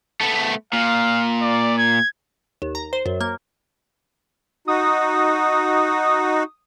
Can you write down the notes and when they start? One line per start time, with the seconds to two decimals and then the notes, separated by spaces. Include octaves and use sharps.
0.21 A3 B3
0.73 A#2 F5
1.42 D5
1.78 G#6
2.62 D#2
2.75 A#5
2.93 C5
3.06 F#2
3.21 A#3
4.68 D#4 F#4 D#6